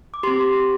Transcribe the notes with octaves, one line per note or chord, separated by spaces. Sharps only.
D6
C4 G4 C6